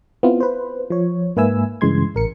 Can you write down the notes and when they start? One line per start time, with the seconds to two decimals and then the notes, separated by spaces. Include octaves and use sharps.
0.23 B3 C4 E4 F4
0.40 B4 C5
0.90 F3 C#5
1.36 G#2 A#3 B4 E5 G#5 E6
1.81 G2 C#3 E3 G#3 C6 G#6
2.15 A1 A#4 C#7